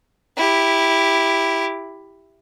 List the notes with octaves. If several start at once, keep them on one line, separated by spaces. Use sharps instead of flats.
E4 G4